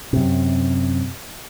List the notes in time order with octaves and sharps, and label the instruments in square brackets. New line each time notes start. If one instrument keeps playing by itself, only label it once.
[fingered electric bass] F#2 C3